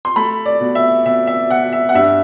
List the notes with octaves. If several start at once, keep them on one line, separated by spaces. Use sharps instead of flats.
C6
A3 B5
D5
B2
E5
B2 E5
E5
B2 F#5
E5
F#5
G2 E5